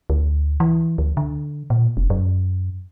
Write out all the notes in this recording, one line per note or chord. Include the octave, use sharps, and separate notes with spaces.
D2
E3
D2
D3
A#2
F1
F#2